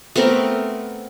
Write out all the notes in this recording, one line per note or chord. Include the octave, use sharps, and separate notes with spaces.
A3 B3 C4 A#4